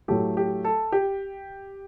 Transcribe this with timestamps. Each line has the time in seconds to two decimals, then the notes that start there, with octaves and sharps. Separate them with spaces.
0.08 A2 F#3 A3 G4
0.37 G4
0.65 A4
0.92 G4